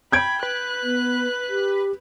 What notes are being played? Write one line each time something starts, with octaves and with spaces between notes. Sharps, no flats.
G5 B5 G6 G#6 D7
B4 F#6
B3
G4